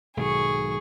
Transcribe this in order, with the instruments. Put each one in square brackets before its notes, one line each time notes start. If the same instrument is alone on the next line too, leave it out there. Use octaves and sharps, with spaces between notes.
[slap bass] B1 G#2 D#3 [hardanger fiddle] G#4 C#6